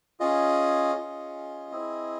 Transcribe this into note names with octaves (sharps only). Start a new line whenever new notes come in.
C#4 F4 G#4 D#5
C#4 F4 G#4
C4 E4 G#4